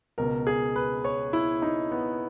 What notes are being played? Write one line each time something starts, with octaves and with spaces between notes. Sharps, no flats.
C#2 B2 A#4
G#4
B4
C#5
E4
D#4
B3